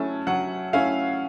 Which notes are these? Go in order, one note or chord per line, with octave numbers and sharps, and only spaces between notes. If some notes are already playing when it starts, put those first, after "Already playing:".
Already playing: F#3 A3 C#4 E4 A5
F#3 F#5
A3 C#4 E4 F5